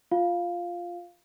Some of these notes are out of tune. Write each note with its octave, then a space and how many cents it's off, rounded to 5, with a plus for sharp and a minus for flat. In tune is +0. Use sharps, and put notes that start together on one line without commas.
F4 +0 F5 +0